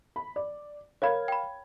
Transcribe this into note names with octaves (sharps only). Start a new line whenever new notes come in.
B5
D5
A#4 C#5 F5 B5 G#6
G5 B5